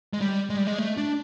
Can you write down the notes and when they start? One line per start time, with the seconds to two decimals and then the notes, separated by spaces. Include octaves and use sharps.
0.13 G#3
0.21 G3
0.50 G#3
0.57 G3
0.67 G#3
0.78 A3
0.97 D4